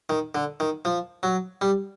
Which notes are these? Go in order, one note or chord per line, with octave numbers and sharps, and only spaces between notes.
D#3
D3
D#3
F3
F#3
G3